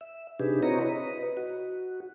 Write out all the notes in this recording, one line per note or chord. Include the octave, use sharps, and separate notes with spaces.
E5
C3 D4 D#4 G4 G#4 B4
C4 E4 F#4 C#5 D#5 A#5
B4 D#5
F#4